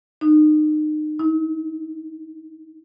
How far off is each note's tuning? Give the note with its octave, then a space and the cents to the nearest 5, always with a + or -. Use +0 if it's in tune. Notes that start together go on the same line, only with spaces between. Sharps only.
D#4 -30
D#4 +40